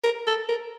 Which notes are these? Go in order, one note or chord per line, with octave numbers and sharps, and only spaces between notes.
A#4
A4
A#4